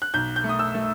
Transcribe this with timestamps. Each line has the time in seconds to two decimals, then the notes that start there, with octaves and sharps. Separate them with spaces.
0.02 F#6
0.14 B1 G6
0.36 G6
0.44 A3
0.49 D#6
0.59 E6
0.74 A3